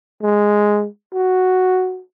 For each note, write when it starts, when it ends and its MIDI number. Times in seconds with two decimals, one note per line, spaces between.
0.22 0.86 56
1.14 2.01 66